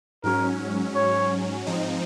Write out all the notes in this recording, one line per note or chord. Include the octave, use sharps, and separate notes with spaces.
G#2 F#3 C#4 A#4
C#5
G#2 F3 C4 D#4